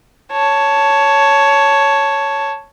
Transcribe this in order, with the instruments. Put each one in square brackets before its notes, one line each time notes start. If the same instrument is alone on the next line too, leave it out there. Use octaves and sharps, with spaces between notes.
[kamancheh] C#5 A5